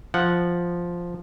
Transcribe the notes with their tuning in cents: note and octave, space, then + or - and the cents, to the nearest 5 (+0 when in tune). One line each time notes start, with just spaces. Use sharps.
F3 +0 F#5 +0